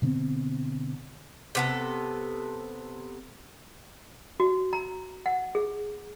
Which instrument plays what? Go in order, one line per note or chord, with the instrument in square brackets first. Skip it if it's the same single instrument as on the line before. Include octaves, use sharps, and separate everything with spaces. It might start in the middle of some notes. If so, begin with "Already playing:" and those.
[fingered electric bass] B2 D3 B3 C4
[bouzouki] C3 B3 A4
[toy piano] F#4
A#5
F#5
G#4